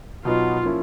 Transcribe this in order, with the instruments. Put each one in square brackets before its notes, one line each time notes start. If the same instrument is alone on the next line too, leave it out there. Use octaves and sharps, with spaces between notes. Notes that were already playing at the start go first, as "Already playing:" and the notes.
[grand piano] B2 F#3 B3 D#4 [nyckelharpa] F4
[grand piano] F3 A#3 C#4 E4